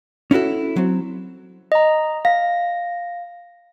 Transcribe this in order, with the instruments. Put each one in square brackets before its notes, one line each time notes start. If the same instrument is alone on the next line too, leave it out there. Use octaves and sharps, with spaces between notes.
[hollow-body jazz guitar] C#4 D#4 E4 F#4 A4
F#3 C4
[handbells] D#5 A#5
[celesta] F5 [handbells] A#6